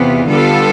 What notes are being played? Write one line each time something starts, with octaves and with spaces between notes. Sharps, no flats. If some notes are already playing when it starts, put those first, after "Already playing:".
Already playing: E2 C3 E3 B3 F4
D3 G3 B3 F4 A4